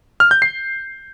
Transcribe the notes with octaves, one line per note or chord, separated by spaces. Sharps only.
F6
G6
C7